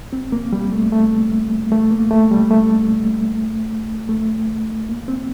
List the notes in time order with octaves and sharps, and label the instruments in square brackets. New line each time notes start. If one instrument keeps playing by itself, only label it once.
[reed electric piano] C4
A#3
G3
A3
A3
A3
A#3
A3
G3
A3
A3
A#3
C4